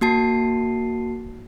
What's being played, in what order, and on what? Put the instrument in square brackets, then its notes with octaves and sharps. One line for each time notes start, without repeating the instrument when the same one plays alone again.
[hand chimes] A#3 F#4 A5 C7